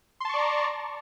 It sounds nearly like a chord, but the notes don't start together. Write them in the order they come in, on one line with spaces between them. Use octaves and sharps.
C6 A5 C#6 D5 A#5